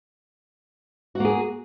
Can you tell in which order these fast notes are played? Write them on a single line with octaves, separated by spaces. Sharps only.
F#4 A#3 G#4